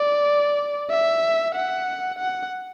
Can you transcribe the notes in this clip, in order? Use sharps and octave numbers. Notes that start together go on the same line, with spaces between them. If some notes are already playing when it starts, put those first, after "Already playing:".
Already playing: D5
E5
F#5
F#5